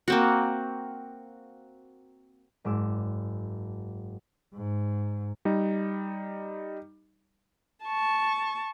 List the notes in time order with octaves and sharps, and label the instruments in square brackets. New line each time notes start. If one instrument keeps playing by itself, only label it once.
[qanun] A#3 C4 F#4
[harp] F#1 G#2 D6 E6
[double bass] G#2
[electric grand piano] G3 D#4
[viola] A5 C#6